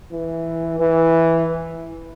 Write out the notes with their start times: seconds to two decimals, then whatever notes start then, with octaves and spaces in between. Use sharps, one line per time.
0.11 E3
0.79 E3